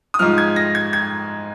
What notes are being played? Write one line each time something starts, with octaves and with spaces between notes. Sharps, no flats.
D#6
G#2 F3 F6
G#6
A#6
G#6
G#6